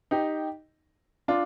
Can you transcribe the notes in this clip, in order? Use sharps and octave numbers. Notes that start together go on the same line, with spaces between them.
D#4 G4
D4 F4